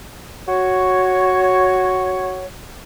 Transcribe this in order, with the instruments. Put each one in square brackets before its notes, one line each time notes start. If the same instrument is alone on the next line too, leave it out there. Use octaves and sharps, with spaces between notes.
[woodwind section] F#4 C#5